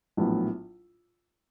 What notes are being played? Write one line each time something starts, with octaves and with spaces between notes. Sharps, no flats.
A#1 A2 F#3 B3 E4